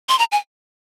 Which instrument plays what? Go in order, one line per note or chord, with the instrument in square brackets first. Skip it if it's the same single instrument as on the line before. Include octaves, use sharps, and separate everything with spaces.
[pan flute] C6
A#5
G#5